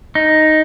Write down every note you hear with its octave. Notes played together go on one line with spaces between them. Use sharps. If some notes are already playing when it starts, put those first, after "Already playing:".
D#4